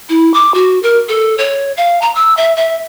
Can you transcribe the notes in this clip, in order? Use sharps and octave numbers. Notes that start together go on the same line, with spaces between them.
E4
D6
F#4
A#4
A4
C#5
F5
A#5
E6
E5
E5